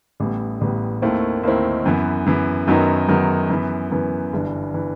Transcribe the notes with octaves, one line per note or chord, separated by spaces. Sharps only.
A1 A2 G3 B3
A1 A2 G3 B3
D#2 D#3 A3 C4 E4
D#2 D#3 A3 C4 E4
F#2 E3 B3
F#2 E3 B3
F#2 D#3 F#3 B3 D#4
F#2 D#3 F#3 B3 D#4
F#2 E3 B3
F#2 E3 B3
G1 G2 E3
E3